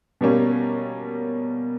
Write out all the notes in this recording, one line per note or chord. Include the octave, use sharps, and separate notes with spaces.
B2 G3 A#3 C#4